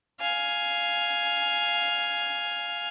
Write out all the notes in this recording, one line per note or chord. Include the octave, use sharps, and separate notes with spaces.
F5 G#5